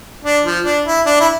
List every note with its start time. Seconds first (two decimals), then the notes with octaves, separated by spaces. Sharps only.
0.24 D4
0.45 F3
0.65 D4
0.86 E4
1.06 D4
1.20 E4